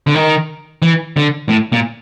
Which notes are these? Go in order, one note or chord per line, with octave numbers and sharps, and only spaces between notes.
D3
D#3
E3
D3
A2
A#2